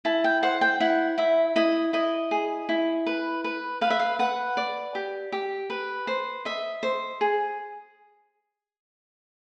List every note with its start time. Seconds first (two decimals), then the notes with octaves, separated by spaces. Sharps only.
0.05 E4 A5
0.24 G5
0.43 C5 F#5
0.61 G5
0.80 E4 F#5
1.18 E4 E5
1.56 E4 D#5
1.93 E4 D#5
2.31 G#4
2.69 E4
3.07 B4
3.44 B4
3.81 B4 F5
3.90 E5
4.00 F5
4.19 B4 F#5
4.57 D5
4.95 G4
5.32 G4
5.70 B4
6.07 C5
6.45 D#5 E5
6.83 C5
7.21 G#4